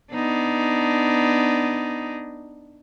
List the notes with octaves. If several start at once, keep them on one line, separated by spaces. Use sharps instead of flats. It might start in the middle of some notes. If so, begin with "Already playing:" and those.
B3 D4 D#4